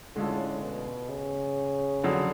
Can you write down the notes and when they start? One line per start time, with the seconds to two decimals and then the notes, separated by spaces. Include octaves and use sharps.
0.16 A2 D3 G#3 C#4 F4 A4
0.62 B2
1.09 C#3
2.04 F2 D3 F#3